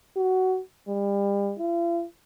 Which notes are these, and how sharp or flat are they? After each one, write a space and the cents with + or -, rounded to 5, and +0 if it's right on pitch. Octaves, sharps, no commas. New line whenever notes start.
F#4 +15
G3 +35
F4 -45